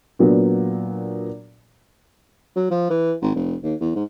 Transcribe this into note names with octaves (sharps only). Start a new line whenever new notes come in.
A#2 F#3 B3 D4
F#3
F3
E3
G#1
F1
D#2
E2
G#2